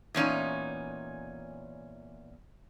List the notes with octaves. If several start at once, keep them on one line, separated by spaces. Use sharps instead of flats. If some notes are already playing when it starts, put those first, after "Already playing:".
E2 A#2 C#4 D#4